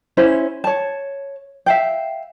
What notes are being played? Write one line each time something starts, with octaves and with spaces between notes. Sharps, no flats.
C#4 E4 C5
C#5 A5
E5 F5 G5